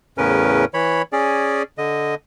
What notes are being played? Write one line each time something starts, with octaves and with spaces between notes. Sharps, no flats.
E2 A2 C#3 C#4 A#4 B4
E3 C#5 B5
C#4 G#4 D5
D3 D#5